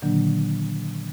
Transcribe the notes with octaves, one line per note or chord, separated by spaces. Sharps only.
A#2 D3 D#3 F#3 A#3 D4